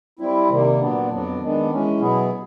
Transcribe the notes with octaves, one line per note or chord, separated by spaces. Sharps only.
G3 C4 E4
C3 D#3 G3 A#3
A#2 F#3 B3 D4
F2 D3 F#3 B3 D4
D#3 G#3 B3 D4
E3 G#3 C#4
B2 F#3 B3 E4 G#4